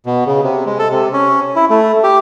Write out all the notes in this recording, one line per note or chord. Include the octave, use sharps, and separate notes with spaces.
B2
C#3
C3
G#3
A4
C3
C#4
E4
A3
G4